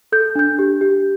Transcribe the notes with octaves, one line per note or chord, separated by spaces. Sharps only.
A4 G6
D4 G6
G4
G4